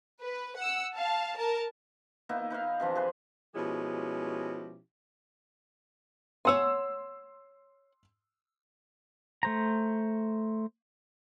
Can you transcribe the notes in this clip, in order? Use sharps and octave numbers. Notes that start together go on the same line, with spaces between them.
B4
F#5 E6
F5 A5
A#4 A5
A#3 B3 D#4 E4
D#4 B4 E5 F5
C3 E3 F3 D4
G#4 B4 C6
B2 F3 G#3 C#4 E4 G4
C#5 F#5 G#5 C6 E6
A3 C5 A#5